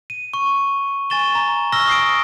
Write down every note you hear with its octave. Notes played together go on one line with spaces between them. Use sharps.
D#7
C#6
G#5 C#6 A6 E7 G7
A#5
C#6 E6 F6 A#6 G7
D#6 C7 D7